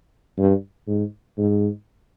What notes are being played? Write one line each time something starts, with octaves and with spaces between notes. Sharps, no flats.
G2
G#2
G#2